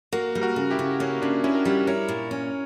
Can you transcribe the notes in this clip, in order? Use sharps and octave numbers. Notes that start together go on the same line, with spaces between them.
A#3 F#4 A#4
G3
F#4 A#4
C#3
E4 G4
C#3
A#3 C#4
C#3 D4
C#3 C#4 E4
A#4
G3 E4 G4
E4 A#4 C#5
A#2
C#4